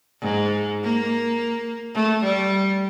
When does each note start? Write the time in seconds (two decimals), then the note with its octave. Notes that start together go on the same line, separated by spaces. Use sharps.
0.21 G#2
0.83 A#3
1.94 A3
2.24 G3